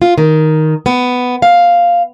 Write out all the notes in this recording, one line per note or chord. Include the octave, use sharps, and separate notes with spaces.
F4
D#3
B3
F5